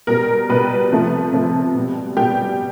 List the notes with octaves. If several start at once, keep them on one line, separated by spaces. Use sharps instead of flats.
B2 G3 A#4
B2 G3 B4
C3 F3 A3
C3 F3 A3
B2 G3
B2 G3 G4